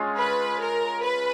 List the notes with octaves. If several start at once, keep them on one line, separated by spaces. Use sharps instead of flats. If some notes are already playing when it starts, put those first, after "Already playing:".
Already playing: G#3 C#4 F4
B4
A#4
B4